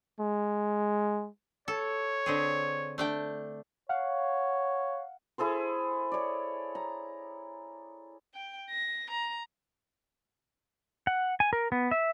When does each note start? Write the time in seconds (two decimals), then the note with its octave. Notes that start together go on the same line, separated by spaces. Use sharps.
0.19 G#3
1.68 A4 C#5
2.26 D3 C4 G#4
2.98 A3 D4 G5
3.89 C#5 F5 F#5
5.38 E4 G#4 A4 C5
6.12 C#5 D5
6.75 A#5
8.34 G5
8.70 A#6
9.10 A#5
11.07 F#5
11.40 G#5
11.53 A#4
11.72 B3
11.91 E5